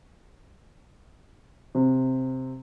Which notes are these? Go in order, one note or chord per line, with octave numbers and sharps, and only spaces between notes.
C3